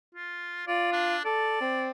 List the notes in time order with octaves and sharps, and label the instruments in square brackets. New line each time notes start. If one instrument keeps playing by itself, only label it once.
[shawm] F4
[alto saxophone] F4 [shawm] D5
[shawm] D4
[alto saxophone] A4 [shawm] D5
[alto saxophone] C4